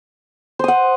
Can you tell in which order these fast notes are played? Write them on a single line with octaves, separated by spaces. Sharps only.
C5 D#6 F#5